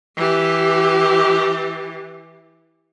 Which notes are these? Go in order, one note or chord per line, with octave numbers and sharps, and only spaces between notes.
E3 G4